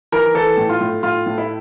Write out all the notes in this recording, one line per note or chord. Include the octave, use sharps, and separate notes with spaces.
E3 A#4
E3 A4
A2
F4
A2
A2 F4
A2
E4